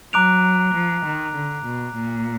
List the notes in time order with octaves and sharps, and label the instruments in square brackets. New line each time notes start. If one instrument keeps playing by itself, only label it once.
[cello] F#3 [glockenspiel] A#5 D6 F#6 D7 F7
[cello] F3
D#3
D3
B2
A#2